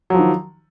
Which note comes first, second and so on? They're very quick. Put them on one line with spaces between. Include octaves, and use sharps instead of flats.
F#3 F3 D#3